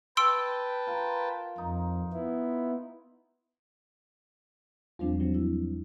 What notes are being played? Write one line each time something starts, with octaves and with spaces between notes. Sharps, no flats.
B4 G5 A5 C6 E6 D7
F4 A#4
F2 D#4
B3 E4
E2 F3 G3 C4 D4 F4
F3 F#3 C4
E4